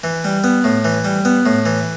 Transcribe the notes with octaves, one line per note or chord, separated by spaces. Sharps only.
E3
G3
B3
A2
E3
G3
B3
A2
E3